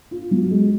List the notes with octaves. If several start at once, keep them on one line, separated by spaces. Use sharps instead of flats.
F4
F#3
G#3